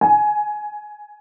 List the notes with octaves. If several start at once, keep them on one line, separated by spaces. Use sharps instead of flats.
G#5